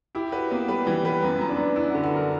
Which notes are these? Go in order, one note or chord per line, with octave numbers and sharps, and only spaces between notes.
E4 G4
F#4 B4
A#3 B3
G3 B4
E3 G3
G3 B4
F#2 B3
F#2
D4
F#2
F#2 E4
F#4
D3
F#4
F#2 A#4